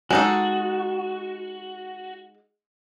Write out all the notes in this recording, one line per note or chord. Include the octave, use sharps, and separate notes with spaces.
G#3 D#4 F#4 A4